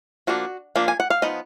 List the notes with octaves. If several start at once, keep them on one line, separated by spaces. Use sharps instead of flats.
F3 A#3 D4 F#4
F3 A#3 D4
G#5
F#5
F5
F3 B3 D#4 D#5